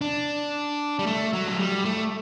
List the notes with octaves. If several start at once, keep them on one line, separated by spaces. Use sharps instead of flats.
D4
G3
A3
F#3
A3
G3
A3